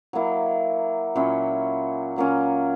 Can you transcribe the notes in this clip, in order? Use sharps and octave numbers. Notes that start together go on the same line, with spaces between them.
F#3 A#3 E4
A#2 F#3 C#4 E4
A#2 F#3 A#3 C#4